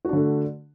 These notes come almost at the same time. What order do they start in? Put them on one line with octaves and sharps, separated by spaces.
F#4 D4 D3 A3